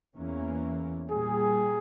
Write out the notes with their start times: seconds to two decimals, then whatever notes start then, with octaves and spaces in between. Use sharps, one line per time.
0.16 E2 E3 A#3 C#4
1.09 A#2 G3 A#3 G#4